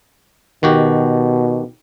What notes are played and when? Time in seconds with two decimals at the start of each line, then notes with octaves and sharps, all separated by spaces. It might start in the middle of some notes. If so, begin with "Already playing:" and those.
0.63 B2 D#3 F#4 G4